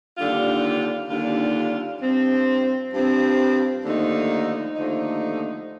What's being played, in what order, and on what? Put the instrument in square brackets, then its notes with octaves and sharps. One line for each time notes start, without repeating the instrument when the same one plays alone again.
[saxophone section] D#2 D3 G3 D4 F4
D#2 D3 G3 D4 F4
G2 F3 C4
G2 F3 C4
D#2 D3 F3 A3 D#4
D#2 D3 F3 A3 D#4